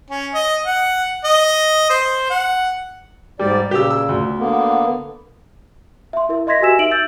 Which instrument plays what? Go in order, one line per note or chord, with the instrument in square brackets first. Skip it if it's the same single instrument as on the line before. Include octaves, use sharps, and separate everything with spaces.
[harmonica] C#4
D#5
F#5
D#5
C5
F#5
[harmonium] G#2 D5 [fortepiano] G3
[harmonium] A#2 C#3 [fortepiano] G4 E6
[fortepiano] E6
D2
[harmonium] D3 A#3 B3
[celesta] E5 C6
E4 A#4 E5
D#5 E5 C6 G#6 A#6 B6
F#4 G4 A#4 G#5 E6 E7
D#4 E5 D7 F#7
E6 G6 A6